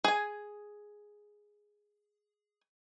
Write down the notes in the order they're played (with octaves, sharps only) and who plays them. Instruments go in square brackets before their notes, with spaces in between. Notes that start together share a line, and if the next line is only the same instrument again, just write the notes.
[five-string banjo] G#4 G#5